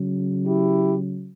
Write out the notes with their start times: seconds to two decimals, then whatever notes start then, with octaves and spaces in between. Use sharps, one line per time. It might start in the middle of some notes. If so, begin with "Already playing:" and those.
Already playing: C#3 F#3
0.44 E4 G4